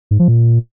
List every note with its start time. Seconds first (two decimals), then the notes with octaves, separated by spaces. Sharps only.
0.11 G#2
0.19 F3
0.28 A#2